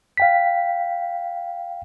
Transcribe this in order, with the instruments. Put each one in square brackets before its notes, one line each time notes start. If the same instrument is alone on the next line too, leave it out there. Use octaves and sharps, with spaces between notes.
[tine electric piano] F5 G5 B6